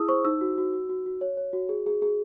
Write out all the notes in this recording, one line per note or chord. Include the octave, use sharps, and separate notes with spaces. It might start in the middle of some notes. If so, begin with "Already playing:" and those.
Already playing: E4 G#4 D#6 E6
C5 C#6
D#4 E6
F#4
F#4
F#4
F#4
F#4
C#5
C#5
F#4
G#4
G#4
G#4